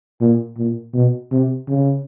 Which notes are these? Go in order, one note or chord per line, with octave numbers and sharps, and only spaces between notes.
A#2
A#2
B2
C3
C#3